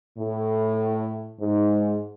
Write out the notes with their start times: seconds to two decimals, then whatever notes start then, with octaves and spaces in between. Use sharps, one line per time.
0.18 A2
1.40 G#2